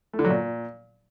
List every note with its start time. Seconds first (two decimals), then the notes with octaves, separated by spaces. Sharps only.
0.13 A3
0.19 D3
0.25 F#3
0.30 A#2